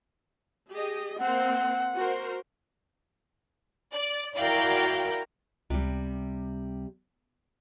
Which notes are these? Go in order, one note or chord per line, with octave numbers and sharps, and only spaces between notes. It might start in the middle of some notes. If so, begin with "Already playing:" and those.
G4 G#4 D#5
A#3 C4 C5 F#5
F#4 A#4 C5
D5
E4 F#4 A#4 D5 F5 G5
C#2 C3 G3